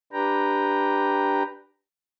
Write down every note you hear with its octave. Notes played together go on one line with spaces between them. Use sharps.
D4 G4 B4 G5 A#5